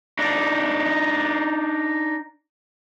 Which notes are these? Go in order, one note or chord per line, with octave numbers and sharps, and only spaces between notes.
D4 D#4